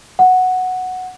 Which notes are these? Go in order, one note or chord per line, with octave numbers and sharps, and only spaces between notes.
F#5